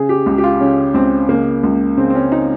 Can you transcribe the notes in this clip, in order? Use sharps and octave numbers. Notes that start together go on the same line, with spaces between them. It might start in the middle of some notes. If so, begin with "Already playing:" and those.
Already playing: C#3 G#4
G4
C#2
G4
F4
C#3 C#4
C#2 C4
C#3 A#3
C#2
C#3 C4
C4
C#4
D#4